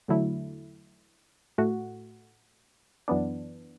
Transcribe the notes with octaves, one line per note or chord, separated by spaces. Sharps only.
E2 D3 F#3 A3 E4
A2 A3 F#4
F#2 E3 B3 D4